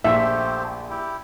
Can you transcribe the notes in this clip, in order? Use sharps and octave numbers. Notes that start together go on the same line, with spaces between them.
A#1 A3 G4 C5 E5
E4 G4